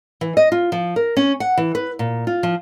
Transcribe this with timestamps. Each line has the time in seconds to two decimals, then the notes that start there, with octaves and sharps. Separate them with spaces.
0.21 E3
0.37 D#5
0.52 F4
0.72 F3
0.96 A#4
1.17 C#4
1.40 F#5
1.57 E3
1.75 B4
1.99 A#2
2.27 F4
2.43 F3